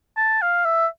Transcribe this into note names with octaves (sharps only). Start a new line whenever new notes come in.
A5
F5
E5